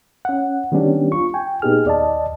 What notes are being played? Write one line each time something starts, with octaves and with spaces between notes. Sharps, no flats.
C#4 F#5
D#3 G3 B3 C#4 D4 G4
F4 C#6
G5 G#5
A#2 B3 D#4 G4 G#4 F6
D#2 D5 D#5 A5